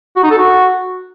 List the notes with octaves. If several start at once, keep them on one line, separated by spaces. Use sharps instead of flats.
F#4
D#4
A4
F#4